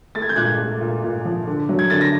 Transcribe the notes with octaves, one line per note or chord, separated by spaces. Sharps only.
A3 A6
G#6
G6
A#2 F#6 G#6
A3
A#2
A#2
F3
D3
F#3
G#6
D3 A6
A#6